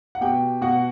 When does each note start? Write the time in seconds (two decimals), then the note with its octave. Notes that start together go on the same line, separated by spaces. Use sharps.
0.15 F#5
0.21 B2 G4 G5
0.61 B2 F#4 F#5